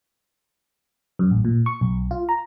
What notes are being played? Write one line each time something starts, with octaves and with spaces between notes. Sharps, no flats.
F#2
A1
A#2
C#6
B1
F4
A#5